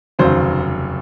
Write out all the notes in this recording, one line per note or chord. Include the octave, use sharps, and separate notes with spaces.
F1 D#2 C#3 F#3 C5